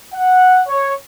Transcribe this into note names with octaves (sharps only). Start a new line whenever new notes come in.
F#5
C#5